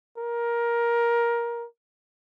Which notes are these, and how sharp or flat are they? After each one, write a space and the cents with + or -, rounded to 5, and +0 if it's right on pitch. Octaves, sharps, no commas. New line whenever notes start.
A#4 +15